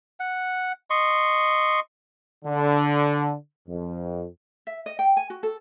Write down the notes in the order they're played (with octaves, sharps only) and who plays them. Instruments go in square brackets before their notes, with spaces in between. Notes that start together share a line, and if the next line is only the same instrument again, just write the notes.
[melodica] F#5
D#5 C6 C#6
[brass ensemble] D3
F2
[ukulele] E5
D#5
G5
G#5
F#4
A4